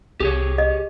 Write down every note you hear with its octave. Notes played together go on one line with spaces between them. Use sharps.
C2 G4 G#4 C#5
D#5